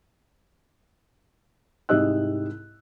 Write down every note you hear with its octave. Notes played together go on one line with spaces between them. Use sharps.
C2 G#2 G4 D#5 E6 F#6